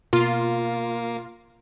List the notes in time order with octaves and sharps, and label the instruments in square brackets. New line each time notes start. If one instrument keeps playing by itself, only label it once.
[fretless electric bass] B2 [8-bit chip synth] A#3 [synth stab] F4